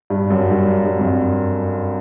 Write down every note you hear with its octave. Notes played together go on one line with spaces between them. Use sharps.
G2
F#2
G2
G2
F2